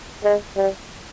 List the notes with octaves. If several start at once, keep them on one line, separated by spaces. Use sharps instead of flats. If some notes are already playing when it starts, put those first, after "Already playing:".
G#3
G3